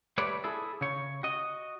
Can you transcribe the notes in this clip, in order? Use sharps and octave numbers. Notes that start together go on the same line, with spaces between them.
G3 A3 B4 C#5 D5
E4 G#4 A4
C#3 C#5
F#4 D#5